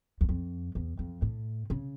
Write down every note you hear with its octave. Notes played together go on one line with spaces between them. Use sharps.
E2
F2
E2
F2
A2
C#3